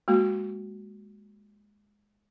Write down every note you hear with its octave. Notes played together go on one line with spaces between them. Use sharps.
G#3 A#3 F#4